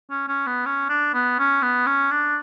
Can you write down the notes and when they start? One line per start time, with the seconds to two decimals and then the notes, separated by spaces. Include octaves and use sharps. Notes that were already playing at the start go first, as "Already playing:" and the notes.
0.10 C#4
0.28 C#4
0.46 B3
0.66 C#4
0.89 D4
1.14 B3
1.39 C#4
1.62 B3
1.87 C#4
2.11 D4